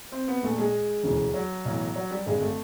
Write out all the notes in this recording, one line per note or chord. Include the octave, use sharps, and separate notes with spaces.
C4
B3
A#1 A#2 A3
G#3
E1 D2 C#3 E3
F#3
B1 A2 E3
F#3
G3
G#1 G2 D3 G#3
A3